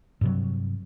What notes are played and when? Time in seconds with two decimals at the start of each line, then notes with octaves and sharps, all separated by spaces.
0.21 G2 C3 F#3